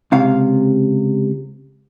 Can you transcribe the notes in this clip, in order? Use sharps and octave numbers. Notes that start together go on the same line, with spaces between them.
C#2 C3 F5